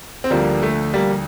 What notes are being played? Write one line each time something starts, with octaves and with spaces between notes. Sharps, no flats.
C4
D2 D3 F3 G3 A#3
A3
G3 A#3